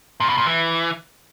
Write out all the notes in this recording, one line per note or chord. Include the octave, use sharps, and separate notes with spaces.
A#2
B2
A#2
E3